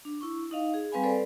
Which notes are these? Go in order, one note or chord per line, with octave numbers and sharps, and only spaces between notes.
D4
E4 C#6
D#4 D#5 F5
G#4
G3 C4 B4 F5 G#5 B5
A4 B4 C5 D5